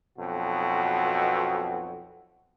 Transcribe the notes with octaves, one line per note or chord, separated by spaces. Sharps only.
B1 F2 B2 F#4